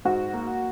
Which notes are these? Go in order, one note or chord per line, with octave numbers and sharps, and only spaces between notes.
G#2 F#4
A#3